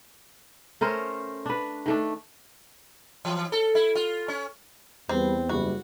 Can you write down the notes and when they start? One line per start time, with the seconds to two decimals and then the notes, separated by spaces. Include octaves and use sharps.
0.81 A3 C#4 A#4 C5
1.46 D4 B4
1.86 D#3 A3 D4
3.25 E3
3.52 A4
3.75 E4
3.95 F4
4.28 C#4
5.09 E2 G3 C4 B4
5.49 F#1 G3 F#4